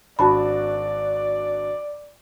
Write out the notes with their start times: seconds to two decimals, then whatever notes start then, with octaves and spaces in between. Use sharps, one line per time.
0.19 G#1 D4 F#4 D5 A5 B5